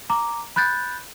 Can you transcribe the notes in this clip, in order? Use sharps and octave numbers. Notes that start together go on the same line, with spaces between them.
A#5 D6
B5 F#6 G6 A6